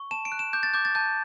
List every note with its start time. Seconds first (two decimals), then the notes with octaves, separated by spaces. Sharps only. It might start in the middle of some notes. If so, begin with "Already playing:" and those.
Already playing: C#6
0.11 A5 E7
0.25 D7
0.32 F#6
0.39 E7
0.53 D6 G6
0.63 A6
0.74 D6 G6
0.85 A6
0.95 A5 G6